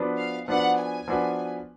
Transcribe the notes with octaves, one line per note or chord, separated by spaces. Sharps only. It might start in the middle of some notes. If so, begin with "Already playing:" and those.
Already playing: F3 B3 D4 F#4 B4
F5
F3 B3 D4 F#4 B4 F#5
G#5
F3 B3 D4 F#4 B4